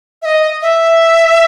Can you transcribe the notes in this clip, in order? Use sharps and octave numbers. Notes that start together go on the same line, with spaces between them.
E5
D#5
E5